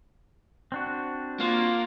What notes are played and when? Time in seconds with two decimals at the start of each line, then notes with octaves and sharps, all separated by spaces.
0.72 C4 D4 F#4
1.40 A#3 F4